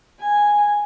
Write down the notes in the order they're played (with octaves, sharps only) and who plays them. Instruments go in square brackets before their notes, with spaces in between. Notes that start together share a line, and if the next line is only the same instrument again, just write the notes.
[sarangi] G#5